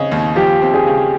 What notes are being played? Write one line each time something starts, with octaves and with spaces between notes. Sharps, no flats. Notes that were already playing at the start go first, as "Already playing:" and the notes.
Already playing: C#3 C4 D#5
D#2
F3 G4
C4
G#4
C#3